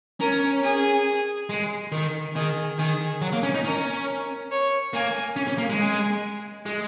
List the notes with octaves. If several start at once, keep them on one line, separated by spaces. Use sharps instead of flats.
C#4 A#4
G#4
G#3
D#3
D#3 G#4
D#3 G#4
F#3
A#3
C#4
D#4
C#4 A#4
C#5
A#3 G#5
C#4
C#4
A#3
G#3
G#5
G#3